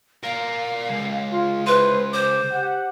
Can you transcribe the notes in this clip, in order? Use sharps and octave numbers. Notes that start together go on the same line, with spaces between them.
A#4 D5 F5
C#2
F4
E4 B4 C5 C6
C5 D6
G4 F#5